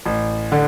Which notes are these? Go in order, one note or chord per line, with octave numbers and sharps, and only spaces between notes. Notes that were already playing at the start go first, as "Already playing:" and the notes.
A1
D3